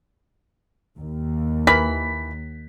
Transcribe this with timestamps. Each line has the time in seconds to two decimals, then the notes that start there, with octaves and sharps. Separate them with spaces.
0.98 D#2
1.67 E3 A#4 B5 B6